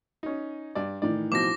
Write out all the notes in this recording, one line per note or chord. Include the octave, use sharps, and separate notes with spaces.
C#4 D#4
G2 D5
A2 D#3 E3 D5
B2 F3 C4 D6 A#6